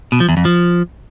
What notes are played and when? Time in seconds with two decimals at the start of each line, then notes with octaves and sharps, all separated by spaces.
0.12 B2
0.20 F3
0.29 E2
0.37 F2
0.45 F3